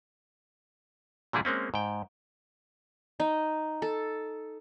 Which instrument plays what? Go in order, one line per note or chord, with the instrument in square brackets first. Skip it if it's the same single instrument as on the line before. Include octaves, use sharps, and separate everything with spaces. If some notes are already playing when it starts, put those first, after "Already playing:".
[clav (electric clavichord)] A#2 D3 E3 G3 E4 G#4
G#3 A#3 C4 C#4
G#2 G5
[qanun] D#4
A4